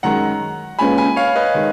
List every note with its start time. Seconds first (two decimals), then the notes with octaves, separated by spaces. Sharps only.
0.03 F#2 D#3 G#3 F#5 A#5
0.79 A#2 G#3 C#4 F4 B4 G#5 B5
0.98 G#5 B5
1.16 C#5 F5
1.36 B4 D#5
1.54 D#3 G#3